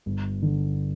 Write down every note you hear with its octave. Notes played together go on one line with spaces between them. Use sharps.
G1
D3